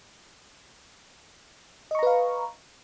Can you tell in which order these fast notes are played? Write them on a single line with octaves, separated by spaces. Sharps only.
D#5 C#6 A#5 B4 F5